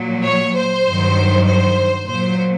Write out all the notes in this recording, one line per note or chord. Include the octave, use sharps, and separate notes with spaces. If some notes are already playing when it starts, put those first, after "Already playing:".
Already playing: A#2 F#3
C#5
C5
G2 D#3 F#3
C5
A#2 F#3 C5